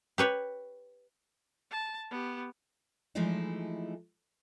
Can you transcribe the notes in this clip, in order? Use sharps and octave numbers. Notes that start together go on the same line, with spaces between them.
G4 B4 C#5
A5
B3 G4
E3 F3 G#3 A3 D#4 E4